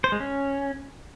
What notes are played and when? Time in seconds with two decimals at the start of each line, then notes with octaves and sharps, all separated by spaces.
0.04 C5
0.12 G#3
0.20 C#4